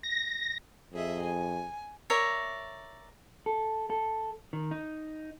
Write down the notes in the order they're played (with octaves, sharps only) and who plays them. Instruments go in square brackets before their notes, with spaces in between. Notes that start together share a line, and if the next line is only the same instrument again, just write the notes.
[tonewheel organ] A#6
[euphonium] F2 [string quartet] G#4 D#5 E5
[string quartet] G#5
[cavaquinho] A#4 C#5 D5 E5
[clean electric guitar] A4
A4
D#3
D#4